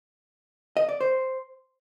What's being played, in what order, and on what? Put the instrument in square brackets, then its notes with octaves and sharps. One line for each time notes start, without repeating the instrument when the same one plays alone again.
[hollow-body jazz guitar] D#5
D5
C5